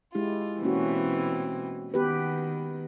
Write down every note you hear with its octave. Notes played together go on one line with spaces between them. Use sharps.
G#3 E4 F4 G4
B2 E3 A#3 C4 C#4 F#4
D#3 B3 G4 B4